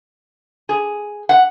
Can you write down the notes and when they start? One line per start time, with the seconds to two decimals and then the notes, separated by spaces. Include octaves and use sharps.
0.69 G#4
1.29 F#5